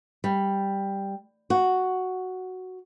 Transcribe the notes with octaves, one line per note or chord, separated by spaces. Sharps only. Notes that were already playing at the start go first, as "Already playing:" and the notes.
G3
F#4